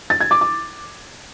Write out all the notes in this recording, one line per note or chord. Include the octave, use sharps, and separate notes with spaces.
A6
G#6
D6
D6